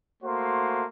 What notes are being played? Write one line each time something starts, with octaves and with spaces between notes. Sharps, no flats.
A3 A#3 F#4 C5 C6